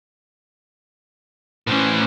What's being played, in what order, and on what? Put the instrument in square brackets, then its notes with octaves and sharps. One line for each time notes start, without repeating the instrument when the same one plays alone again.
[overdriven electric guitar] A2 E3 [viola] C#4 C5